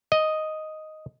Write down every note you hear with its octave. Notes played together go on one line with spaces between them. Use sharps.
D#5